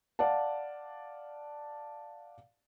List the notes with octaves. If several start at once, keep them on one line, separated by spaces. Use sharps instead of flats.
D5 F5 F#5 A5